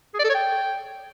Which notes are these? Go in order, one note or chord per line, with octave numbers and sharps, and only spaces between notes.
G#4
D5
A4
C#5
G5